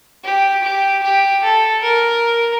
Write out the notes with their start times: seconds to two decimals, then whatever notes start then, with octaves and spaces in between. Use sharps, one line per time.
0.24 G4
0.64 G4
1.03 G4
1.43 A4
1.83 A#4